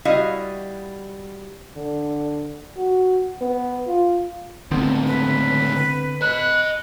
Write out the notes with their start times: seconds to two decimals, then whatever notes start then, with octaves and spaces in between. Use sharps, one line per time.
0.05 G3 E4 F#4 D#5 F5
1.76 D3
2.77 F#4
3.41 B3
3.87 F4
4.71 C#2 A2 D3 B3 C4
5.06 B4
6.22 D#5 B5 F#6